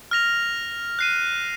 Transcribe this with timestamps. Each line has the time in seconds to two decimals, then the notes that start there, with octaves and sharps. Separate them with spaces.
0.11 F6 A#6 F7
0.99 F#6 C7 D#7